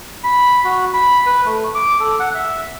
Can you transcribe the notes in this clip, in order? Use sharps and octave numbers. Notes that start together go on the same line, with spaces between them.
B5
F#4
B5
B4
A3
D6
A4
F#5
E5